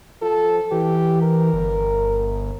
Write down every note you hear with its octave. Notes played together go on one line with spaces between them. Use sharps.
F3 A4
E3 G4
A#4
G1